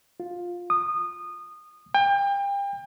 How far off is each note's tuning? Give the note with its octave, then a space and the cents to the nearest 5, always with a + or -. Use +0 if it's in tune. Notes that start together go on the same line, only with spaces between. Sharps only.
F4 +10
D#6 -20
G5 +35